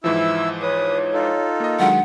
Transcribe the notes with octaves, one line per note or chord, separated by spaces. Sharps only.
G#2 E3 F3 E4 E6
B4 C#5 D#6
D#4 F4 A4
A#3 D#5
D#3 F#3 G#3 D4 F#5